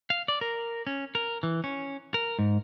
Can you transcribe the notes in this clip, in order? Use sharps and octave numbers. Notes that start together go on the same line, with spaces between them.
F5
D5
A#4
C#4
A#4
E3
C#4
A#4
G#2